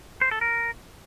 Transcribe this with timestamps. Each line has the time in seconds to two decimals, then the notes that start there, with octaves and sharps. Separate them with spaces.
0.21 C5
0.31 A4
0.41 A#4